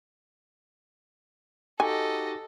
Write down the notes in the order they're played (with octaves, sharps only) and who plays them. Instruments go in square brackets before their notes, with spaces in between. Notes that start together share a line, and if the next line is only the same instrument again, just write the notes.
[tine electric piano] D#4 F#4 G4 [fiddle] A4 D#5 [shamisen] G#5